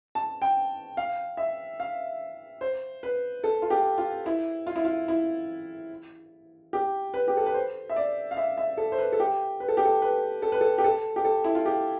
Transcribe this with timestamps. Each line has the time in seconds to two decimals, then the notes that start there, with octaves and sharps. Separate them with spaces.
0.15 A5
0.42 G5
0.97 F5
1.37 E5
1.80 F5
2.61 C5
3.03 B4
3.44 A4
3.62 F4
3.70 G4
3.98 F4
4.26 E4
4.67 F4
4.76 E4
4.85 F4
5.08 E4
6.73 G4
7.14 B4
7.28 G4
7.37 A4
7.46 B4
7.54 C5
7.90 E5
7.96 D5
8.31 F5
8.37 E5
8.58 E5
8.77 A4
8.92 C5
8.99 B4
9.12 A4
9.20 G4
9.60 B4
9.68 A4
9.77 G4
9.85 A4
10.02 B4
10.42 A4
10.52 B4
10.61 A4
10.78 G4
10.84 A4
11.16 G4
11.25 A4
11.44 E4
11.55 F4
11.66 G4